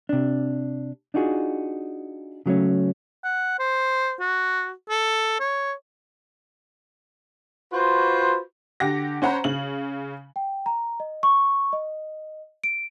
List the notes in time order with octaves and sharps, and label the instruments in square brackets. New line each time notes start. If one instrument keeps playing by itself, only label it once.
[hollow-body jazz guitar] C3 D4
D4 D#4 F4 F#4 G#4
C#3 F#3 A3 C#4
[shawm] F#5
C5
F#4
A4
C#5
[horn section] F4 F#4 B4 C5
[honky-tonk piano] D3 G4 F#5 A#6
C#4 C5 F#5 A#5 B5
C#3 F#7
[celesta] G5
A#5
D#5
C#6
D#5
D7